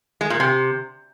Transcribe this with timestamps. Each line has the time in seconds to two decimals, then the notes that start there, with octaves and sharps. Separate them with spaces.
0.21 G#3
0.30 A#2
0.40 C3